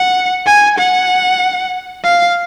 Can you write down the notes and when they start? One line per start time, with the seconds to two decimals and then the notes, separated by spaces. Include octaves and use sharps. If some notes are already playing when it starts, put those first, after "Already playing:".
Already playing: F#5
0.46 G#5
0.78 F#5
2.04 F5